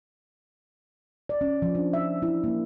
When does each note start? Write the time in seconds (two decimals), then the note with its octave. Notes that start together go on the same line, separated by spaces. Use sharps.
1.29 D5
1.41 C#4
1.62 F3
1.75 D4
1.93 E5
2.22 E4
2.44 A#3